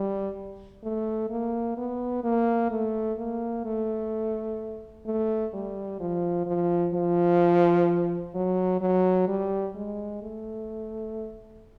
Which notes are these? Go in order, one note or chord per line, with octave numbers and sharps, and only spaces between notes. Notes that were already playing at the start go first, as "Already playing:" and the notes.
Already playing: G3
A3
A#3
B3
A#3
A3
A#3
A3
A3
G3
F3
F3
F3
F#3
F#3
G3
G#3
A3